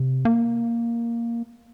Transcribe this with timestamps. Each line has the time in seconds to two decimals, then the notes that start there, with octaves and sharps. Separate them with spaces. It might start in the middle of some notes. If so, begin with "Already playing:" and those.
Already playing: C3
0.25 A#3